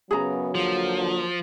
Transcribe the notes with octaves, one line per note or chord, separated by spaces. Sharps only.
F#2 C#3 F#3 B3 G#4 A#5
D3 F3 A#3 F4